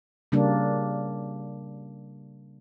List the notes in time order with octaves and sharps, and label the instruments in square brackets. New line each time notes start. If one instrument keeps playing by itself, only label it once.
[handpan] C#3 G3 A#3 D4